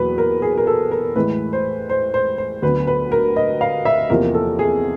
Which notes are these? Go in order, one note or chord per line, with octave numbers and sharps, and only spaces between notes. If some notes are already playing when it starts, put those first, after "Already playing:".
Already playing: E2 B2 F#3 A#3 B4
A#4
G#4
A#4
A4
A#4
A2 E3 G#3 B4
C5
C5
C5
C5
D2 D3 F#3 B3 B4
B4
A#4
D#5
F5
E5
E2 C3 F3 A#3 A#4
A4
G#4